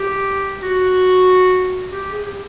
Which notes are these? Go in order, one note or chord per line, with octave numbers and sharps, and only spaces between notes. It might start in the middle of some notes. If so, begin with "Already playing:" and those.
Already playing: G4
F#4
G4
G#4
G4